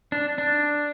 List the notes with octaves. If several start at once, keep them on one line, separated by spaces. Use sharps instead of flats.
D4
D4